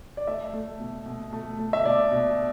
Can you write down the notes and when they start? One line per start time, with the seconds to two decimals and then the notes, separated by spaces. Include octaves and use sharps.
0.17 D5
0.27 A3 E5
0.54 A3
0.80 B2
1.06 B2
1.33 A3
1.59 A3
1.73 E5
1.85 B2 D5
2.12 B2